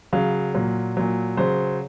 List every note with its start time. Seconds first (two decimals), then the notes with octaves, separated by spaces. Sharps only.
0.13 C#3 F#3 F5
0.54 A#2 F#3
0.97 A#2 F#3
1.37 C#3 F#3 C5